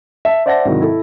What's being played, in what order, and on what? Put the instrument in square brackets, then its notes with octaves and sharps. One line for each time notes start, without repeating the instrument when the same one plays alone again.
[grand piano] E5 A5
C5 D5 E5 F#5 A5 A#6
G#2 C3 D#3 F#3 E4
E4 A4